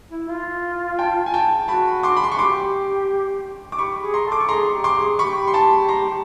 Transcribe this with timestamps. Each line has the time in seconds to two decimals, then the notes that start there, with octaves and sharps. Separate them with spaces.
0.11 E4
0.28 F4
0.99 G5 A5
1.26 G#5
1.34 G5 A5
1.68 F#4 A5 B5
2.03 C6 D6
2.17 B5
2.24 C6
2.32 C#6
2.39 G4 C6 D6
3.72 D6
3.78 G4 B5 C#6
4.02 G#4
4.14 A#5 C6
4.26 A4
4.32 D6
4.40 C#6
4.49 G#4 A#5 C6
4.72 G4
4.84 C6 D6
4.96 G#4
5.19 G4 B5 C#6
5.48 C6
5.54 A5 B5
5.89 A#5 C6